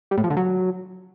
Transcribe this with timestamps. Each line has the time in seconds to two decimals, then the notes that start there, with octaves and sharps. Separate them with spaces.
0.11 G3
0.18 A2
0.24 F3
0.30 D3
0.37 F#3